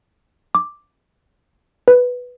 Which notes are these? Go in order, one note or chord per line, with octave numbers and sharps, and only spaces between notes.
D6
B4